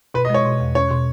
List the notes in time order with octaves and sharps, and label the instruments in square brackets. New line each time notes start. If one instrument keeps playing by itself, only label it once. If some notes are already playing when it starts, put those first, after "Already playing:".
[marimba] B2 [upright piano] B4
[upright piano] D#5
[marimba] G#3 [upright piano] C#5
[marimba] B2
E2
[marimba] C#4 [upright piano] C#5
[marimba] B2